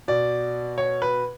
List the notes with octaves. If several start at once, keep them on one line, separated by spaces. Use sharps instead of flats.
B2 D5
C#5
B4